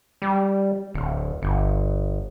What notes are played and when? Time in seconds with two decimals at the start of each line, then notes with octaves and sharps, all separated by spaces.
0.22 G3
0.94 D1
1.42 G1